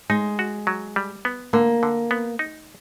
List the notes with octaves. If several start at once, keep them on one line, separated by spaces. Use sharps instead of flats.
G#3 D#4
F#4
F#3
G3
B3
D3 A#3
D3
B3
D#4